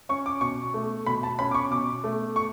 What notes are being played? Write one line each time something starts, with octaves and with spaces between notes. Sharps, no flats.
C#4 C#6
D6
B2 C#6
A3
B2 B5
A5
C#4 B5
D6
C#6
B2 D6
A3
C#6